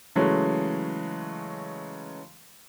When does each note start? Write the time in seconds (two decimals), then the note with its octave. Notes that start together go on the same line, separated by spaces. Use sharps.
0.16 C#3 E3 F#3 G#3 A3